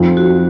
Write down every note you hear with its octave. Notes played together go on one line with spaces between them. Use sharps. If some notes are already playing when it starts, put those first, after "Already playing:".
Already playing: F2 D#4
F#4